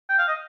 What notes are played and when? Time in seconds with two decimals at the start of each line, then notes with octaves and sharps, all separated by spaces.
0.09 G5
0.18 F5
0.28 D#5